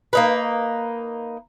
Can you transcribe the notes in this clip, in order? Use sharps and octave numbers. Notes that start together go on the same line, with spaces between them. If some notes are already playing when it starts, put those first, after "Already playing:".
A#3 D#4 B4